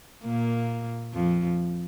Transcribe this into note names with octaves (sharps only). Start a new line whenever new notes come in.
A#2 A#3
F2 F3